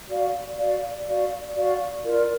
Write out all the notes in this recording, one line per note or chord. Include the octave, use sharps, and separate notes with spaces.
F#4 D5 F5
F#4 D5 F5
F#4 D5 F5
F#4 D5 F5
F4 A#4 D5